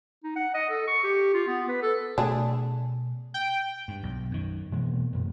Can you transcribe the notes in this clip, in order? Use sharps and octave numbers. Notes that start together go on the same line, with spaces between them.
D#4
F#5
D#5
A4
C#6
G4
F4
B3
B4
A4
B2 A3 D4 G#4
G5
G2
B1
F#2 D#3
B2 E3 G#3 A#3
F#2 A#2